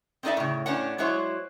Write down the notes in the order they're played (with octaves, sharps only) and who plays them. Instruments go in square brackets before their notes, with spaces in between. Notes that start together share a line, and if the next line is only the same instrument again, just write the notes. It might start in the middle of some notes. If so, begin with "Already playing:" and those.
[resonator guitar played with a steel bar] C4 D4 D#4 A4 D5 E5
A2 C#3
A2 C#4 D4 F#5
F#3 G#3 E4 F#4 C5 C#5